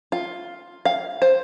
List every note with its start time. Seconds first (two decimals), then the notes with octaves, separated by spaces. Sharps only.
0.12 F4
0.85 F5
1.22 C5